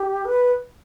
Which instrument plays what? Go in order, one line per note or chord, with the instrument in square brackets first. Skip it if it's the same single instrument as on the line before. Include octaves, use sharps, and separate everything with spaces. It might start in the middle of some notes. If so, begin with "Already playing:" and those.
Already playing: [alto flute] G4
B4